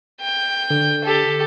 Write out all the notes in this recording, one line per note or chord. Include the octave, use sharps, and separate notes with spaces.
G5
D3
G4 A4